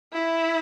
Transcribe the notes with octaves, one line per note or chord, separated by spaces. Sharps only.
E4